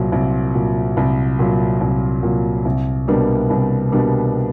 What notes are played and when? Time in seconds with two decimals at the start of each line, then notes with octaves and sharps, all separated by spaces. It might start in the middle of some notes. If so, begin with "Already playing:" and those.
Already playing: C2 A#2 F#3
0.12 C2
0.55 A#2 F#3
0.97 C2
1.39 A#2 F#3
1.81 C2
2.23 A#2 F#3
2.65 C2
3.08 B2 G3 A#3 D4
3.50 C2
3.92 B2 G3 A#3 D4